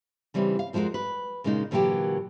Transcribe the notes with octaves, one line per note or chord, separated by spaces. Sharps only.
C#3 E3 G3 C4 D#4
F5
F2 F3 G#3 C#4 F#4 A#4
B4
A#2 C#3 G#3 A#3 D#4
A#2 D3 E3 F#3 A#3 G4